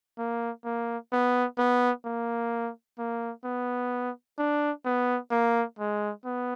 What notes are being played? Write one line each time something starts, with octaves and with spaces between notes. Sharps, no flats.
A#3
A#3
B3
B3
A#3
A#3
B3
D4
B3
A#3
G#3
B3